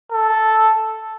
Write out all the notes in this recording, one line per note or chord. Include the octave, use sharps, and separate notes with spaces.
A4